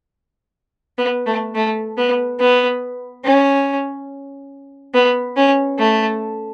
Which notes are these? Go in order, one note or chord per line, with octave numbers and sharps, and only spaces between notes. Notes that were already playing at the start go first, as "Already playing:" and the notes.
B3
A3
A3
B3
B3
C#4
B3
C#4
A3